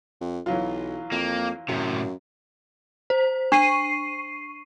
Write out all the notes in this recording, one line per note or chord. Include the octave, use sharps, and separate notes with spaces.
F2
B1 E3 F#3 F4
F2 A#3
F#2 A2 C3
C5
D4 C#6 C7 D#7